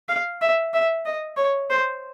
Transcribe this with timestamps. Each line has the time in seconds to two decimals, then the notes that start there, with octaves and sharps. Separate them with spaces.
0.09 F5
0.41 E5
0.74 E5
1.06 D#5
1.37 C#5
1.70 C5